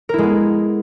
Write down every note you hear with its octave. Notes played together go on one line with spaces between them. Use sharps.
G#3 B3 E4 A#4